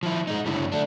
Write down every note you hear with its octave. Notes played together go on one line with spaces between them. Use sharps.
F3 E4
G#3 D#4
F#2 C#3 D4 E4
A3 D4